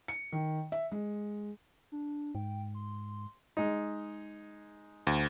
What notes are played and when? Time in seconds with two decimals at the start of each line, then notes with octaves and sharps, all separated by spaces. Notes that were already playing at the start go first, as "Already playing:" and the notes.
0.08 C#7
0.32 D#3
0.72 E5
0.92 G#3
1.92 D4
2.35 G#2 G5
2.74 C6
3.57 G#3 D#4
5.07 D2